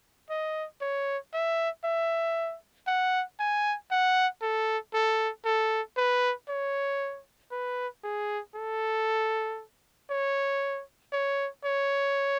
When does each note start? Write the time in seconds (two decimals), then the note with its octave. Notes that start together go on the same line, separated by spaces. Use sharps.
0.30 D#5
0.81 C#5
1.33 E5
1.84 E5
2.87 F#5
3.39 G#5
3.91 F#5
4.42 A4
4.94 A4
5.45 A4
5.97 B4
6.49 C#5
7.52 B4
8.04 G#4
8.55 A4
10.10 C#5
11.13 C#5
11.65 C#5